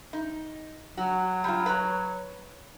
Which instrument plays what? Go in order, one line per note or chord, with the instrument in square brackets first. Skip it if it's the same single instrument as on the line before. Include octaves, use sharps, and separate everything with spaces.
[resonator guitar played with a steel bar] D#4
[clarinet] F#3 [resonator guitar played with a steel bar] F#4
[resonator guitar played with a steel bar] G3 F4
B4 C#5 A#5